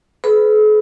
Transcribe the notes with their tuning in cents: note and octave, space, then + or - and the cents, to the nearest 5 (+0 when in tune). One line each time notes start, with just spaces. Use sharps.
G#4 +45 B4 +35 B5 +0